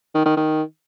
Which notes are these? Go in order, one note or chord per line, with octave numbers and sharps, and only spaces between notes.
D#3
D#3
D#3